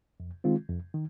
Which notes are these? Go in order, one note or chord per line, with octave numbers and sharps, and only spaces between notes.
F2
D#3 G#3 C4 F4
F2
D#3